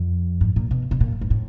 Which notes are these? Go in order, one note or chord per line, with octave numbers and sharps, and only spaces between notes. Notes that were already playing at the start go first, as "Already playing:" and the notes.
Already playing: F2
G#2
A#2
B2
B2
A#2
G#2
A2